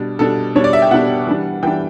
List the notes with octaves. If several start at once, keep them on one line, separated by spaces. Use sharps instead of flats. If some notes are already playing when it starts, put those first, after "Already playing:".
Already playing: B2 G3 D4
B2 G3 D4 A4
B2 G3 D4 C#5
D5
E5
G5
B2 G3 D4 F#5
E3 G3 D4
E3 G3 D4 G5